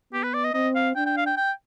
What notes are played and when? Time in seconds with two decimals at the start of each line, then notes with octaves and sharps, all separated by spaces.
0.13 B3 G4
0.23 B4
0.34 D5
0.44 D#5
0.54 C4 D#5
0.75 F5
0.96 D4 G5
1.06 G5
1.17 F5
1.26 G5
1.37 G5